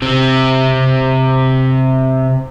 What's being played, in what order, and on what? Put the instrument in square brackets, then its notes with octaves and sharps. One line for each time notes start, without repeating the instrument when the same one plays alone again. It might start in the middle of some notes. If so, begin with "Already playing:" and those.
[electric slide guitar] C3 C4